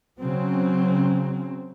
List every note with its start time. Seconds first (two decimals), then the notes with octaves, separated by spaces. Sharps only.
0.20 C#3 F#3 C4